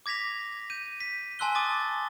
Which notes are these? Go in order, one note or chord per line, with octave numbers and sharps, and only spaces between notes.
D6 G#6 A#6 B6 F7
G6 D#7
B6
G#5 A5 C6 E6 F#6 G7
G#5 D6 D#6 A6